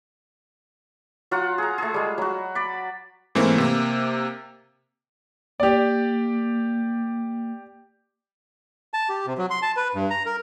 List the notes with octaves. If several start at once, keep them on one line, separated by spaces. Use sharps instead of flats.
F#3 F4 F#4 F#5
G#4 A#5
A3 G#4
G3 G#3
F#3 F#4
D5 B5
G#2 E3 A3 A#3 C4
C3 A#3
A#3 G4 D5
A5
G4
C3
F#3
C6
A5
B4
G2
A#5
A#4